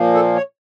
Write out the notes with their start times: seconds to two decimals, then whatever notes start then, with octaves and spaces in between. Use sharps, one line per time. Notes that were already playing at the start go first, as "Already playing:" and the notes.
Already playing: A#2 F3 A#3
0.14 A4
0.36 C#5